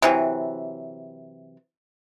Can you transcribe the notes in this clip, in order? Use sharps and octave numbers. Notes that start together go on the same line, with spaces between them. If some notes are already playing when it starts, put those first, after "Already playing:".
C3 E3 F#3